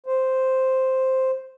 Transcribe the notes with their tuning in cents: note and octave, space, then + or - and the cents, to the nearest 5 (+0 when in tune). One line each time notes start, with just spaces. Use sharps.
C5 +0